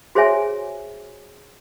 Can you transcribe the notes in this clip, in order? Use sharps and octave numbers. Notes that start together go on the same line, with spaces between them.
F#4 G#4 C5 C#5 E5 G#5